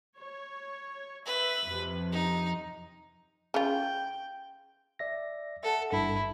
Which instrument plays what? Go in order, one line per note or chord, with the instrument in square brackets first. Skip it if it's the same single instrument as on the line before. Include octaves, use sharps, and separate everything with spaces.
[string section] C#5
[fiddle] B4 [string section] E5
[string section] F2 C3
[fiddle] D#4
[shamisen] C#3 F4 [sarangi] G5
[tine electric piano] D5 E5 A#6
[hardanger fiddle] A4 [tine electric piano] E5 F#5
[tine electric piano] G#1 G2 [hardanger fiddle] E4